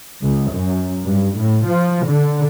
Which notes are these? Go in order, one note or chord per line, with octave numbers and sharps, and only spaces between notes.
C#2
F#2
G2
A2
F3
D3